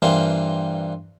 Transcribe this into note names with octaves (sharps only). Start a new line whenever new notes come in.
G2 E3 G3 A#3 C4 F4